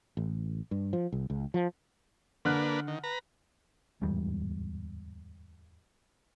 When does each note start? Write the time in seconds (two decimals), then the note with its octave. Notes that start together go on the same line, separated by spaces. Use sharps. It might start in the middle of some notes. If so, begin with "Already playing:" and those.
0.17 A1
0.71 G2
0.93 F3
1.12 C2
1.30 C#2
1.54 F3
2.45 D3 A#3 D4 B4 F6 F#6
2.87 D#3
3.04 B4 A#5
4.01 D1 E2 G#2 G3